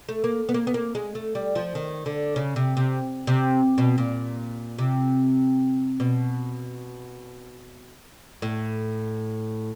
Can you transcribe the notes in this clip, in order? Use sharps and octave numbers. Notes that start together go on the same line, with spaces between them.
A3
A#3
B3
A#3
B3
A#3
G#3
A3
G3
F3
D#3
D3
C#3
C3
C3
C3
B2
A#2
C3
B2
A2